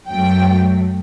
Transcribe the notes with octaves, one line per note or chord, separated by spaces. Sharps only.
F#2 F#3 A3 G5